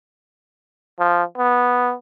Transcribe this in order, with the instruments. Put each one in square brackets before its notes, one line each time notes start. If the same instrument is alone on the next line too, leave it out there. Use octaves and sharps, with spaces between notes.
[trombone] F3
B3